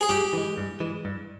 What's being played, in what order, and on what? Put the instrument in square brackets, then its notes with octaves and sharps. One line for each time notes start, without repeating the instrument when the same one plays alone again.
[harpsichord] G#4
[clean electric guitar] G2 [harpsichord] G4
[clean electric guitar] E3 G#3
G2
E3 G#3
G2